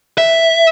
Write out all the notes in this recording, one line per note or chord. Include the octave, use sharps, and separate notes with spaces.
E5